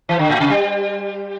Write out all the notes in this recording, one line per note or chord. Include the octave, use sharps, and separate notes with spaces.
E3
D3
A2
C3
G3